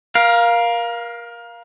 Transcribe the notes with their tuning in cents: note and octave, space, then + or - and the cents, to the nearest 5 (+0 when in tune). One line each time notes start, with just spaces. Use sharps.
A#4 +25 F5 +0